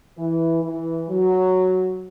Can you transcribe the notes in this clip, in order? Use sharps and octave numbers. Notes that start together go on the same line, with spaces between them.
E3
E3
F#3